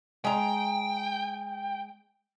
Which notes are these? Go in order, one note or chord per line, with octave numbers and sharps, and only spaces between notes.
G#3 G5 A#5